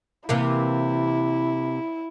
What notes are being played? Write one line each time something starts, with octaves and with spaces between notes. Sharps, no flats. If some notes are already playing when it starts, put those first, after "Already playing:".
C3 E3 A#3 E4